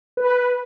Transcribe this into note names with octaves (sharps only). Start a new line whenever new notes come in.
B4